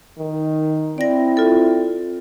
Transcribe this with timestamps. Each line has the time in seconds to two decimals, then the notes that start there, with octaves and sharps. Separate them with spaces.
0.19 D#3
0.98 C4 E4 D5 A#6
1.37 F4 A4